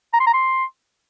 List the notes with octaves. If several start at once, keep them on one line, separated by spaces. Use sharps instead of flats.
A#5
C6
A#5
C6